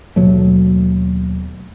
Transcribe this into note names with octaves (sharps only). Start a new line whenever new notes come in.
D#2 B2 F#3 A3